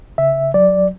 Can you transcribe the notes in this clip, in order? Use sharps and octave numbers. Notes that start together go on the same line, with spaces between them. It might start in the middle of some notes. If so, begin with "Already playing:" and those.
C#3 E5
F#3 D5